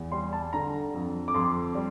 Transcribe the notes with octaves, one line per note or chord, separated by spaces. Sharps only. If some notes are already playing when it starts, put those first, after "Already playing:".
Already playing: E2
G3 C6
A5
D3 A#5
F2
D6
F2 C6
G3